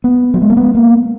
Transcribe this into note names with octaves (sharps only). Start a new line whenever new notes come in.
B3
F#3
G#3
A#3
B3
A#3